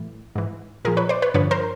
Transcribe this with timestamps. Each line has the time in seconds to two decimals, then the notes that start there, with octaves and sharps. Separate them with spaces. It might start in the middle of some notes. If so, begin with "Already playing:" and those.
Already playing: A2 E3
0.35 G#2 E3
0.85 A#2 F3 G#4 A#4
0.97 B4 C#5
1.09 C5 D5
1.22 B4 C#5
1.34 G2 D3 F3 B4 C#5
1.51 A#4 C5